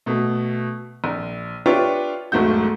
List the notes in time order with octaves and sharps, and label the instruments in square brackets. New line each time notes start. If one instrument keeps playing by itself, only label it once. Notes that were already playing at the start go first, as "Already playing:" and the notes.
[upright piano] B2 A3
A#1
D4 F4 G4 B4 C#5 E5
E1 B1 G#2 A3 F#4 G6